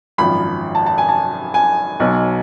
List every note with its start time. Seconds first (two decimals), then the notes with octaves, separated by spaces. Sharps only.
0.18 G#1 F#2 F3 B5
0.75 A5
0.86 A5
0.98 G#5
1.09 A5
1.54 G#5
2.00 B1 B2 F#3